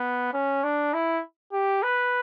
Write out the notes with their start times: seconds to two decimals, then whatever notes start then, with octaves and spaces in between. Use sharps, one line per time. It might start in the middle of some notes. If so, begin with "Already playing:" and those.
Already playing: B3
0.33 C#4
0.63 D4
0.94 E4
1.52 G4
1.83 B4